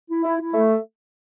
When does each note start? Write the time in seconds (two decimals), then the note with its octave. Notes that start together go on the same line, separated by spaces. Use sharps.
0.09 E4
0.24 E4
0.40 E4
0.54 A3